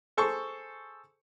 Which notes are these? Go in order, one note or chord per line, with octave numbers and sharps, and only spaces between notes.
G#4 A4 C5 C#6